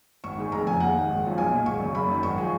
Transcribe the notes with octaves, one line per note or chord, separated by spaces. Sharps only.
G#1 C#6
G#2 D#3 G#3
F1 A#5
F2 C#3 G#5
D#2 F#5
D#3 G#3
G#1
F#2 F3 G#3
B1 G#5
A#2 G#3
G#1 C#6
F#2 C#3
F#1 B5
F#2 D#3
G#1 C#6
F3 G#3